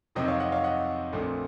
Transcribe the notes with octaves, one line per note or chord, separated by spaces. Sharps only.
F2 C3 D#3 F#3 C4 C5 D#5
C#5 F5
D#5 F#5
C#5 F5
D#5 F#5
A#1 A#2 A3 C4